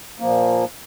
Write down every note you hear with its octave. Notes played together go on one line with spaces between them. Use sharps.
A#2 F3 A#3